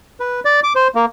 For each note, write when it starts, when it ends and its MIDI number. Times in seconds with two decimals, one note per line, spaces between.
0.20 0.40 71
0.45 0.60 74
0.63 0.73 86
0.75 0.88 72
0.95 1.06 58